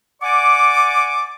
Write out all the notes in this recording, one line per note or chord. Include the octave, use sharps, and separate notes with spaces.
D5 F#5 G#5 C#6 D6